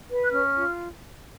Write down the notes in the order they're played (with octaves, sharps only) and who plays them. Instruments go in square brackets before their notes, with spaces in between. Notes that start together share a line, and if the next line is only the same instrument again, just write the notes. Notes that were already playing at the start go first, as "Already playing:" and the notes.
[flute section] B4
F#6
C#4 F6
F4